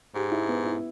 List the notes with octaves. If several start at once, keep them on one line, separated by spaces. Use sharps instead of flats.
G#2 G4
E4
B3
E4